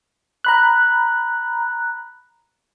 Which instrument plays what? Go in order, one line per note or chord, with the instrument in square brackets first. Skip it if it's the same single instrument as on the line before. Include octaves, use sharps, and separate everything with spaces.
[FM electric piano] A#5 B5 F#6